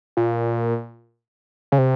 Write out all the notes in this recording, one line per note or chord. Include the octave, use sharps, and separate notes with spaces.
A#2
C#3
C3